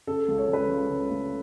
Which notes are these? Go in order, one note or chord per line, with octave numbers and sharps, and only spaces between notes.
C#3 A4
C#2
C#5
C#2
B4
C#2
C#2
A3